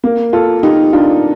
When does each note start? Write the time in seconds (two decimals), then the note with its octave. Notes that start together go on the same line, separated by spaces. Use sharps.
0.04 A#3
0.33 F4 A4
0.63 D#4 G4
0.93 D4 F4